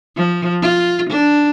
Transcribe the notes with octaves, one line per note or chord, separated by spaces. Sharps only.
F3
F4
D4